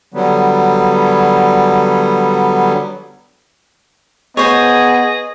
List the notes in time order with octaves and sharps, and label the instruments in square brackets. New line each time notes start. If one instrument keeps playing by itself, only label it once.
[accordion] D3 F#3 G3 B3
[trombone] B3 [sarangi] G#4 [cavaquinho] C5 C#5 [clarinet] D#5